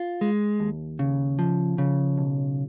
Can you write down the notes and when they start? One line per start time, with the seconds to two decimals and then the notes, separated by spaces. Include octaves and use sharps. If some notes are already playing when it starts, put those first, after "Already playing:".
Already playing: F4
0.21 G#3
0.60 D#2
0.99 C#3
1.39 F3
1.78 C#3
2.18 B1